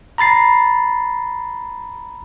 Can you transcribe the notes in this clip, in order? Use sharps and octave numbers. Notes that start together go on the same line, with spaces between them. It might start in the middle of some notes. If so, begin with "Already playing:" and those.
A#5 B5 A6 C7